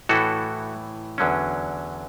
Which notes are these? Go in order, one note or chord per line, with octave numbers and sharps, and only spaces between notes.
A2 E3 A3 E4 F#4 A4
E2 D3 F#3 C#4